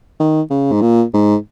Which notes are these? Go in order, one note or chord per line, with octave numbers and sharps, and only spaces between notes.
D#3
C#3
G#2
A#2
G#2